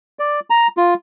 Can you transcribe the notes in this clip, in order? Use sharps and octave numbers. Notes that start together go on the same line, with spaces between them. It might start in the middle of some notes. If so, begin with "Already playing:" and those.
D5
A#5
F4